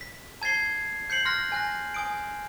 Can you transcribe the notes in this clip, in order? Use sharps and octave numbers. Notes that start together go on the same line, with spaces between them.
B6
A5 G#6 A6 C7 G7
G6 C7 C#7 F#7
C6 F6 F#6 A#6
G#5 F#6 A#6
G#5 D#6 D7